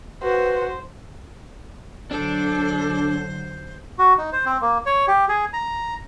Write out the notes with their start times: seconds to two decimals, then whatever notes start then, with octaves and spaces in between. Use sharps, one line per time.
0.23 F#4 B4 C5
2.11 D3 F#3 D4 A4 C5
3.99 F#4
4.18 D#4
4.32 C5
4.46 C4
4.61 A#3
4.86 C#5
5.08 G4
5.29 G#4
5.53 A#5